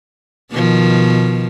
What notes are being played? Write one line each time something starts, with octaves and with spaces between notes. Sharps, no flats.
B2 D#3 F3